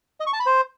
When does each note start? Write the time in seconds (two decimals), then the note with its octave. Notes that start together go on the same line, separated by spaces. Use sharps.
0.20 D#5
0.27 C#6
0.33 A5
0.40 B5
0.46 C5